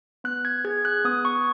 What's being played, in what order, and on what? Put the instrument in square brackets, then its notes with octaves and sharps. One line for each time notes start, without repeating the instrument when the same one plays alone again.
[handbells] B3 F#6
G#6
G#4 G#6
F#6
B3 D#6
C#6